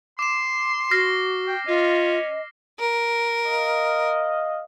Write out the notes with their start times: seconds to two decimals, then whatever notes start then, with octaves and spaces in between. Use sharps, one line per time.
0.19 C6 D6 E7
0.91 F#4 F6 A#6 C7
1.47 G5
1.67 C#4 F4 D#5
2.79 A#4
3.46 D#5 F5